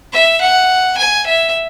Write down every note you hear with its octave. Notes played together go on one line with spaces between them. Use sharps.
E5
F#5
G#5
E5